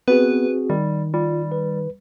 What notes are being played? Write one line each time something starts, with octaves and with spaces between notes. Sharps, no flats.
B3 C4 F#4 G#4 B4
D#3 G3
G3 F4
B4